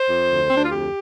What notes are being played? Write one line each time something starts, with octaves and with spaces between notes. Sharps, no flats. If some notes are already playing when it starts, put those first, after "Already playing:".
Already playing: C5
F2
D2
C4
D2 D4
F4
F2 G4